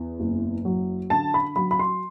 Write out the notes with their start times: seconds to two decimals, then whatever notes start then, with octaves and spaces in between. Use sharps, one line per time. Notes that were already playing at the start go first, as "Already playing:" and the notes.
Already playing: E2
0.20 F#1
0.65 F#3
1.10 D3 A5
1.34 B5
1.56 F#3 B5
1.71 B5
1.79 C6